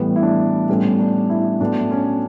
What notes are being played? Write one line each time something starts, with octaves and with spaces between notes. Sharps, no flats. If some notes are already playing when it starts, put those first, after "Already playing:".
Already playing: A2 E3 G3 B3 B4
E4
D4
A2 G3 B3 C#4
D4
E4
A2 F#3 B3 D4
C#4